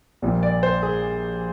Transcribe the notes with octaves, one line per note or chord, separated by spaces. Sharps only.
A#1 A#2 G3
D5
C5
G#4